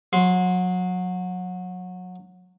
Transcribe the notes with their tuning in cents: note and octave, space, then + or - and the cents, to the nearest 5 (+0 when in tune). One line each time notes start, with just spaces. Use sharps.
F#3 -25 C6 +0